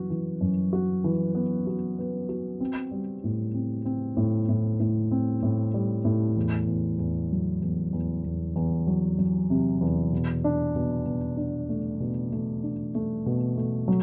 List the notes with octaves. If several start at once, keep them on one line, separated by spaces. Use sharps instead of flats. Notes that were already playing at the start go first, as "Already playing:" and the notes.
Already playing: F#2 E3 F#4
E3
F#2
F#4
E3
B3
F#4
B3
F#4
C4
G3
A2
C4
C4
A2
A2
A2
C4
A2
G3
A2
E2
E2
E2
F#3
E2
E2
E2
E2
F#3
F#3
C3
E2
B2
D4
B2
B2
D4
A3
B2
A3
D4
A3
B2
A3
F#3